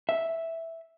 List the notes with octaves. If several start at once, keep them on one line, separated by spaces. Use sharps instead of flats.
E5